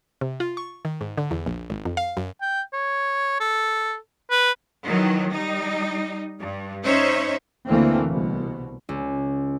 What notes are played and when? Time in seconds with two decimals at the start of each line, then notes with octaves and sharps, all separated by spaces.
0.21 C3
0.40 F4
0.57 C#6
0.85 D#3
1.01 G#2
1.18 D3
1.31 E2
1.46 A#1
1.70 G#1
1.85 F2
1.97 F5
2.17 F#2
2.41 G5
2.73 C#5
3.40 A4
4.31 B4
4.85 D#3 E3 F#3
5.31 G3 D#4
6.40 G2
6.84 C#4 D#4 C5 C#5 E5
7.67 D2 E3 A3 A#3 C4
8.09 C2 B2
8.89 C#2